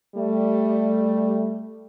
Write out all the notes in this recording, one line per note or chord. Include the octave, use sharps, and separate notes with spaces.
G3 A3